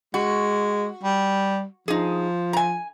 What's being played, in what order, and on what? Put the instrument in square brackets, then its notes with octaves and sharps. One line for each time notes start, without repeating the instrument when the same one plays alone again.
[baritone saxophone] G#3 [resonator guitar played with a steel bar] F#4
[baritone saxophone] G3
[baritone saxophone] F3 [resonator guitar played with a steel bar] D#4 G#4
[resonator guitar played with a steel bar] G#5 A#5